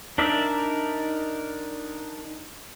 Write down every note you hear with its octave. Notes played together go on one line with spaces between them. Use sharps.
D4 D#4 A#4 D5 E5